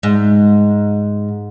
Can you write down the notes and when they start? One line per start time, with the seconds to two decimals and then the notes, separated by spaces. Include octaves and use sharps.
0.03 G#2